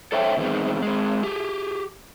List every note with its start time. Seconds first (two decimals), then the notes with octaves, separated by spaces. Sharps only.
0.12 A4 C5 C#5 E5 G5
0.37 B2 D#3 E3 G3 G#3 C4
0.82 G#3 C4
1.23 G4 G#4